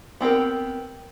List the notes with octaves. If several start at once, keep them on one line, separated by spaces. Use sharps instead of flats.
B3 C4 G4 A#4